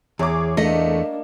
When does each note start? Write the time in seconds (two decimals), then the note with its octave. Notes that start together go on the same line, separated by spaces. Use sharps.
0.19 E2 G#4 C#5 D6
0.57 A3 A#3 D4 D#5